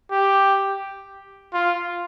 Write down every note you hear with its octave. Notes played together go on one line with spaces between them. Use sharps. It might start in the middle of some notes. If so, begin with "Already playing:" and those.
G4
F4